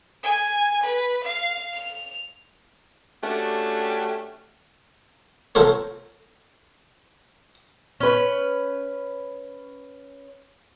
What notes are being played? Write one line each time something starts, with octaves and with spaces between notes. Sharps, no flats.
G#5
B4
F5
F7
A3 C#4 D4 F#4 G4
F4 A4 A#4 C5 C#5
C#4 B4